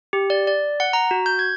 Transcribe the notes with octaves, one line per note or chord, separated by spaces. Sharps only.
G4
D5
D5
F#5
A#5
F#4
G6
G#6